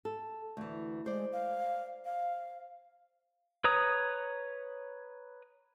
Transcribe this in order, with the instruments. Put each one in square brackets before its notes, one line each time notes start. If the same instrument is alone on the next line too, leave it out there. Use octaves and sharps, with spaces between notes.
[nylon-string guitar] A4
D2 E3
[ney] G#3 [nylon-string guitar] C5 D5
[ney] F5
F5
[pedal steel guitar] B4 C#5 A#5 D#6